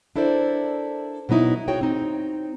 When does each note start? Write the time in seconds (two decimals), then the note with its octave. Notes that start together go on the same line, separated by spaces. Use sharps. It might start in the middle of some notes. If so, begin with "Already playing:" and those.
0.16 D4 E4 A4 A#4 C5 D5
1.29 B2 F#3 B3 D#4 E4
1.68 F#4 G#4 C#5 G5
1.81 C4 D#4